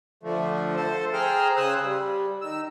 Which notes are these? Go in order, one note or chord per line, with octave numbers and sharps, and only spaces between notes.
D3 F3 A3
A4 C5
G#4 C5 G5 A#5 F6
C#3 C5 G#5 D#6 E6 F#6
G3
D#3 E6